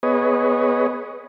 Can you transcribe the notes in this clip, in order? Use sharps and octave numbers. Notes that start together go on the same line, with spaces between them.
B3 G#4 B4 C#5 D#5